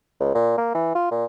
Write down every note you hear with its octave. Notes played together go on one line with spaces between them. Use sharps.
C#2
A#2
A#3
E3
F4
A#2